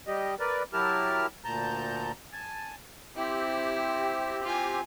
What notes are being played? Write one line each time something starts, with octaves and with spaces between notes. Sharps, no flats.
G3 G4 D#5
A#4 B4 D5
F#3 E4 G4 A#4 A5 F6
D2 A#2 A5 A#5 G6
G#5 A5
C4 E4 G4
F4 G#5